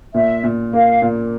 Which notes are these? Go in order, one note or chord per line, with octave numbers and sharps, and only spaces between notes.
A#2 E5
A#2
A#3 F5
A#2